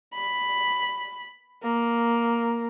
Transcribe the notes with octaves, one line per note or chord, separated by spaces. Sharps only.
B5
A#3